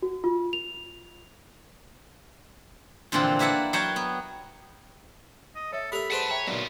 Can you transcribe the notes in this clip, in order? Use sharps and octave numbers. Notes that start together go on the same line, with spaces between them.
F#4
F4
F7
A#2 D3 E3 F3 C4 A#4
A#3 E4 B4 E5 F#5 A5
F#3 A#4 F#5 G5 A5 A#5
B3
D#5
A4 C#5 E5
G4 A4 A#4 E5 B5
G#4 B4 C5 F#5 A5
C#5 E5 G5 A#5
B1 A#2 F#3 F4